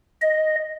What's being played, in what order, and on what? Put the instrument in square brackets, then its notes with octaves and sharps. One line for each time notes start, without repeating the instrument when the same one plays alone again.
[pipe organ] D#5